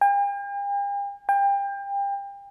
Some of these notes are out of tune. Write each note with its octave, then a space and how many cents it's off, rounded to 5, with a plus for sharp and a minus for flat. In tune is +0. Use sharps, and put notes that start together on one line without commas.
G5 +45
G5 +30